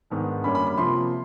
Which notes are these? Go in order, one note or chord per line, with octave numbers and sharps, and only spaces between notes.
G#2 D#3 G#3 B3 D4
F#2 D3 G3 A#3 C#4 B5
B5
B5
C3 F3 A#3 C6